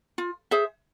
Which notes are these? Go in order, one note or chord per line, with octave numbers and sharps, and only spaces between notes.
F4
G#4 C5 E5